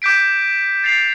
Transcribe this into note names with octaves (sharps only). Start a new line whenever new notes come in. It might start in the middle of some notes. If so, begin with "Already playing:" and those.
D6 G6 B6 D7
A6 C7 F7